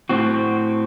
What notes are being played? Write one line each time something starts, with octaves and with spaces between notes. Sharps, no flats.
A2 C4 F#4